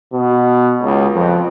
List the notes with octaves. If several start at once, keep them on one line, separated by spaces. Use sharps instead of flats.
B2
C#2
F2